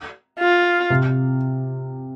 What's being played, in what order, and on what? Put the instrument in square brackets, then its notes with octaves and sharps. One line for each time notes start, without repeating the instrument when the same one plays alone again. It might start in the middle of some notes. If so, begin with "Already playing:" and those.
[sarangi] F4
[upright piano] C3